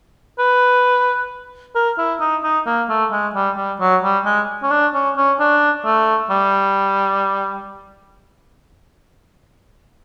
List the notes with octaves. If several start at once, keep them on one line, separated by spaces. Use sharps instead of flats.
B4
A#4
E4
D#4
D#4
A#3
A3
G#3
G3
G3
F#3
G3
G#3
C#4
D4
C#4
C#4
D4
A3
G3